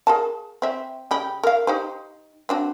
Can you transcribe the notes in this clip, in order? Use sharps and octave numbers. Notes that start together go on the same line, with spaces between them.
G#4 A#4 A5
C4 E5
C#3 G4 B5
A#4 F5
D#4 G4 C5
C4 D4 F#4